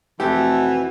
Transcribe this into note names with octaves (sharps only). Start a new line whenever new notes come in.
F2 C3 E3 A3 F#4 G4